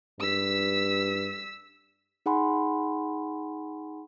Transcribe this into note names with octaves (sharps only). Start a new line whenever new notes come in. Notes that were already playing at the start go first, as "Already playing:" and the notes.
G2 E6 B6
D#4 G#4 F#5 G#5 B5 C6